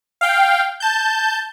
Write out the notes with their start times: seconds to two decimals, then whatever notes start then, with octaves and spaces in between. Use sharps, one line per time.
0.21 F5 G5
0.80 A5 G6